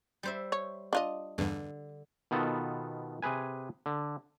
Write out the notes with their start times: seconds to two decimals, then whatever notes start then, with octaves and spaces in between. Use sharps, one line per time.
0.23 G3 C5 E5
0.52 C#5
0.93 D4 F4 D#5
1.38 E2 G2 D3
2.31 B2 D#3 B3 F4 A4
3.22 C3 G#4 B4 G#5
3.86 D3